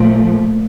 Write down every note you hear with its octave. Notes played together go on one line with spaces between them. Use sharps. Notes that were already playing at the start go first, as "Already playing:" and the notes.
Already playing: A#2 F3 A3